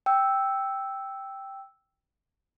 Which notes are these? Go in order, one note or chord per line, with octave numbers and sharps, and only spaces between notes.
G5 E6